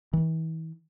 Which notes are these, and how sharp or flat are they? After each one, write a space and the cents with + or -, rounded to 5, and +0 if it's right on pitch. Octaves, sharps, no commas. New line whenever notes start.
E3 -40